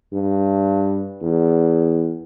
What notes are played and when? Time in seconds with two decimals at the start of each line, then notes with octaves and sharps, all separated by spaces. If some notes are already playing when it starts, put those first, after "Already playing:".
0.13 G2
1.22 E2